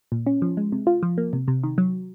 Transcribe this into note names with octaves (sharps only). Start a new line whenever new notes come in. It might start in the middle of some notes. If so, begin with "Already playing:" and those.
A#2
C#4
F3
G#3
C3
F4
F3
A#3
C3
C3
D#3
F#3